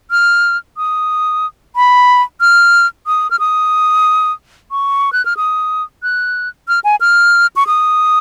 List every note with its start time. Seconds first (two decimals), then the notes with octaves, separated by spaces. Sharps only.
0.11 F6
0.77 D#6
1.76 B5
2.41 F6
3.07 D#6
3.31 F6
3.40 D#6
4.71 C#6
5.13 F#6
5.25 F6
5.37 D#6
6.03 F#6
6.68 F6
6.84 G#5
7.01 F6
7.56 C#6
7.67 D#6